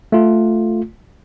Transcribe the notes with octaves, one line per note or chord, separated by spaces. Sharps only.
A3 F4